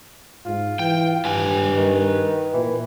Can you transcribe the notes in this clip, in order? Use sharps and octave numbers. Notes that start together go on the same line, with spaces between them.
G#2 F4
E3 G5
G2 B4 G5 G#5
D#3
A#2 E3